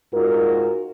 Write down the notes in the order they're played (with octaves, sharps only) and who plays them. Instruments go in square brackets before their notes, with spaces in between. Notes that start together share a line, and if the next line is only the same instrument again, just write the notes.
[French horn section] G#2 F4 F#4 A#4